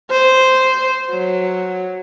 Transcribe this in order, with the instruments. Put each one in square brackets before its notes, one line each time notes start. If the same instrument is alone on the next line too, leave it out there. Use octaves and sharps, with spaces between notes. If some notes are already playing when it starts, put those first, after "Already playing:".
[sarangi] C5
F#3